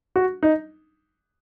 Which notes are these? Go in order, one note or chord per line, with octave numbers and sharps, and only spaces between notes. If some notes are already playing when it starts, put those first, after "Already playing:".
F#4
D#4